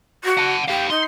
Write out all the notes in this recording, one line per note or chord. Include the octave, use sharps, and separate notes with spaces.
F#4
F#5 A5
G4 F5 G5
D#4 C6